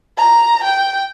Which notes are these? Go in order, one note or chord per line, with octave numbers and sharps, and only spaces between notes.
A#5
G5